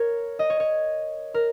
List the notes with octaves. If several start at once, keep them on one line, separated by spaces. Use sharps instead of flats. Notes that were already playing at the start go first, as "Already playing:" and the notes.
Already playing: A#4 C#5
D#5
C#5
C#5
A#4